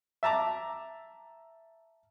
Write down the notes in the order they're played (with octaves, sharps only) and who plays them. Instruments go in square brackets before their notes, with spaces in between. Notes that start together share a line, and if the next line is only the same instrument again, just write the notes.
[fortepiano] E5 A5 A#5 D6